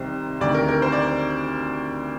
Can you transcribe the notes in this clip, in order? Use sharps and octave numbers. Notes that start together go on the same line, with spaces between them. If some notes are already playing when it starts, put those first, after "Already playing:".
Already playing: C2 C3 D#3 C5
D2 C3 D#3 D5
A#4
A#4
C5
D5